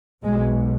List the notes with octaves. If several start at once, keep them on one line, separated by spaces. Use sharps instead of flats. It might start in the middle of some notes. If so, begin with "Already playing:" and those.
B1 B2 G#3